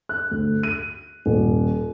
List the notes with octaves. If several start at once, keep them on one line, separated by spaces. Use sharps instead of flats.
F#6
D2
D#7
D#1